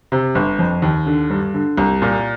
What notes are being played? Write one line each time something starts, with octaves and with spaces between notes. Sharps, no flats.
C3
G1
F2
D#2
D3
G2
D3
C2
A#2